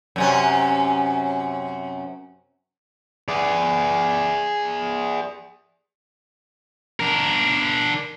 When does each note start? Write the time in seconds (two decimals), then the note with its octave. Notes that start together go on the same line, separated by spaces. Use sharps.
0.16 F#2 C3 C#4
3.28 G#4 D5
7.00 D4 A#4